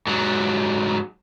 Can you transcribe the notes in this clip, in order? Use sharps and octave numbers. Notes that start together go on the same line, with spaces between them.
G#2 F#3